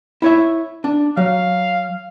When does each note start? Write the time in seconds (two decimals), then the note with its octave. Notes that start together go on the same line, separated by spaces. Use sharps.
0.22 E4 C#5 E5
0.84 D4
1.17 F#3 F5